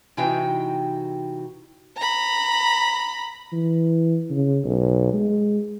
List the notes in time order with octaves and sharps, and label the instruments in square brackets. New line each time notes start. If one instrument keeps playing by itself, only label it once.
[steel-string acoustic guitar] C3 E3 D#4 F#4 G5
[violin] A#5 B5
[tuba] E3
C#3
B1
G#3